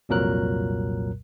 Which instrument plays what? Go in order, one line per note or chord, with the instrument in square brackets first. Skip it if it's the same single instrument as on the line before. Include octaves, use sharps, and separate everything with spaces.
[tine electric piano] C2 F2 A#2 F#3 A#4 F#6